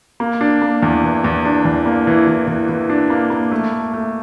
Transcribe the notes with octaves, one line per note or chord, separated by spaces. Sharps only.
A#3
D4
A#3
E2
E3
E2
D4
E2
A#3
E3
E3
E3
E3
D4
A#3
A#3
A3
A3
A3